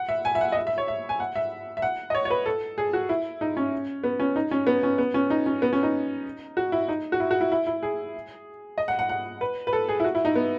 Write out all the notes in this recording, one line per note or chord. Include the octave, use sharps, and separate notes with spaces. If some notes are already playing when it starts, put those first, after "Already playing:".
Already playing: F#5
E5
G#5
E5
F#5
D#5
E5
E5
C#5
E5
G#5
F#5
E5
E5
F#5
D#5
C#5
C#5
B4
A4
G#4
F#4
E4
D#4
C#4
B3
C#4
D#4
C#4
B3
C#4
B3
C#4
D#4
C#4
B3
C#4
D#4
F#4
E4
D#4
F#4
E4
F#4
E4
E4
E4
G#4
D#5
F#5
F#5
F#5
B4
B4
A4
G#4
E4
F#4
E4
D#4
B3